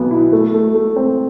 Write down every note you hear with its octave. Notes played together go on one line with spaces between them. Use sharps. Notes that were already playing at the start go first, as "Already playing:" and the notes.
Already playing: B1 B2 B3
E4
A3
A3
A3
C4